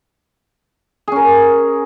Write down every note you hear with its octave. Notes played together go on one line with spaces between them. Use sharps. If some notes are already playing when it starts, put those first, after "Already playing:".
C#4 G#4 A#4